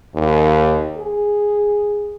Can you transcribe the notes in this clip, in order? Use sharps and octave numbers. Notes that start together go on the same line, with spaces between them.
D#2
G#4